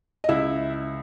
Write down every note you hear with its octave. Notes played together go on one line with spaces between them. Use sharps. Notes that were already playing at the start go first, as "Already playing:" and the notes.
D#5
C#2 E4 E5